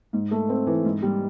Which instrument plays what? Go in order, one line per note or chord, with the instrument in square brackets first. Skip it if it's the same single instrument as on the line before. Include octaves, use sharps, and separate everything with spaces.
[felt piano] G#2
A3
C4
E3
G#2
G3